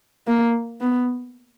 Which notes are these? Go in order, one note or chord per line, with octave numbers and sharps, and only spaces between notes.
A#3
B3